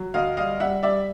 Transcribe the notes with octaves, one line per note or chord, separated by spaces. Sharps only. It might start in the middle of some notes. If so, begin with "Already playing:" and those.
Already playing: F#3
D2 D#5 F5
G3 D#5 F5
G3 E5 F#5
G3 D5 E5